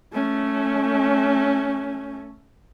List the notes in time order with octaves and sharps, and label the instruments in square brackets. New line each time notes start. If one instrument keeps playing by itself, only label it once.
[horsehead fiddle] A3 C#4